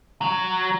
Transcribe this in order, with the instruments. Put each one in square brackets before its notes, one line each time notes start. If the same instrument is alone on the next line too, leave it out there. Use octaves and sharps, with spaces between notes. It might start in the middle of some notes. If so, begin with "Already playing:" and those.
[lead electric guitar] F#3